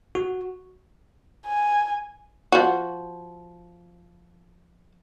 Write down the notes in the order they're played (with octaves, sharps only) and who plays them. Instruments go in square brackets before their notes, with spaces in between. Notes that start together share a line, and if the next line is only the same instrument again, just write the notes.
[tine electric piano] F#4
[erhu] G#5
[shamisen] F3 F#4